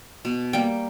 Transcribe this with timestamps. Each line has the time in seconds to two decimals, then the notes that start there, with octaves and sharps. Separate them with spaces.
0.25 B2
0.53 G3 A#3 G5